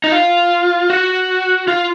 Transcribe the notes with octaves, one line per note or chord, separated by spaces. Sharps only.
D#4
F4
F#4
F4